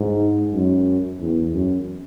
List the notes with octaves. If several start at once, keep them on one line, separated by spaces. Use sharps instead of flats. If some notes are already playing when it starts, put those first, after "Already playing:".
Already playing: G#2
F#2
E2
F#2